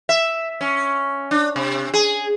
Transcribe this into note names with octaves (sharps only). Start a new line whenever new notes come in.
E5
C#4
D4
C3
G#4